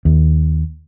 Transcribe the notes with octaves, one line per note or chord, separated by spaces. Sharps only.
D#2